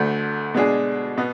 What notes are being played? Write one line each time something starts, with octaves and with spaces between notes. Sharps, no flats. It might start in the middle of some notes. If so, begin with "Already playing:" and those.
Already playing: D2 D3 A3
B2 G#3 D4 G#4
B2 B3